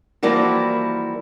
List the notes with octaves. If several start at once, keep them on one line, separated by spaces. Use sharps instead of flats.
E3 F3 G3 A#3 E4 F#4